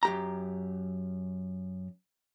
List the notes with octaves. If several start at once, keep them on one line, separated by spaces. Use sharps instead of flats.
F#2 G4 A#5